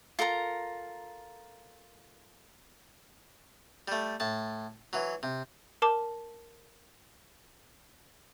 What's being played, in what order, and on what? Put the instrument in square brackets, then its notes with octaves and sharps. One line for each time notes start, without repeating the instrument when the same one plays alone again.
[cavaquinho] F4 A4 A#4 A#5
[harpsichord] G3 A3
A2 A5
E3 F#3
C3
[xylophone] A#4 A5 D6